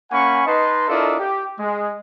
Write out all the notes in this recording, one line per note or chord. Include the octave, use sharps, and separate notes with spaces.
A#3 C#4 F#5 G#5 B5 C#6
D#4 B4 D#5 A5 C6
D4 E4 F4 A4 A#4 D#5
G4
G#3